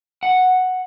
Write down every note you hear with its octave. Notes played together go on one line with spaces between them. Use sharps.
F#5